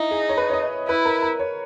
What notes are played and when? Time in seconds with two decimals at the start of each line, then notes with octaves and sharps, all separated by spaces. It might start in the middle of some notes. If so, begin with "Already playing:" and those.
Already playing: D#4 E4
0.11 G#4
0.29 C#5
0.37 B4
0.50 C#5
0.53 D#5
0.88 E4 B4
1.05 A#4
1.22 A#4
1.39 C#5